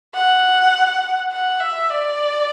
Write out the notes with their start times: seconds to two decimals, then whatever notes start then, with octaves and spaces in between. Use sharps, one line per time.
0.15 F#5
1.32 F#5
1.60 E5
1.90 D5